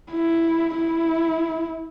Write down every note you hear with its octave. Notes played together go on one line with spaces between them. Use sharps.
E4
E4